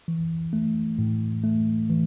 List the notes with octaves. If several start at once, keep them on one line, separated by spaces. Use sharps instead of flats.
E3
A3
A2
A3
E3